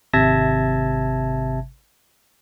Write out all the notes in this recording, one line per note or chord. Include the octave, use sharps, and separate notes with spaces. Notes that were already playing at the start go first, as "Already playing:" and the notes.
G#1 C3 E5 A5 G#6 A#6